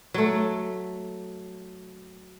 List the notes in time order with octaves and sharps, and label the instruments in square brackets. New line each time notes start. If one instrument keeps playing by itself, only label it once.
[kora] F#3 A3